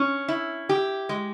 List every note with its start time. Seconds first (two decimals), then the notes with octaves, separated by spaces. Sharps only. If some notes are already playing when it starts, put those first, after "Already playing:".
Already playing: C#4
0.28 E4
0.69 G4
1.09 G#3